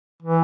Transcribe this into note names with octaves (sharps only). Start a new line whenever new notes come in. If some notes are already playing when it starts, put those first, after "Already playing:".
E3